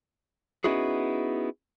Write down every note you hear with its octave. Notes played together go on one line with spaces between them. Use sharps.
B3 C#4 D#4 E4 F#4 G#4